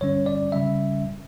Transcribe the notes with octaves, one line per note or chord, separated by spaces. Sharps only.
G2 D3 G3 C#4 C#5
D5
C#3 G3 C#4 E5